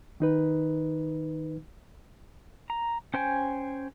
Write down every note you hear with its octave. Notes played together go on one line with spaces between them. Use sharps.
D#3 D#4 B4
A#5
C#4 C5 G5 G#5